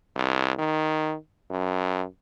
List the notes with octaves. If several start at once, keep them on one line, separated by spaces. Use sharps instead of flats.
C2
D#3
F#2